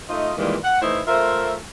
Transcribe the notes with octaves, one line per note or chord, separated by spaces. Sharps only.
A3 D#4 F4 D#5
A#2 D#3 E3 G3 G#3 A#3
F#5
E3 A3 D#4 E4 C5
A3 F4 A#4 C5 E5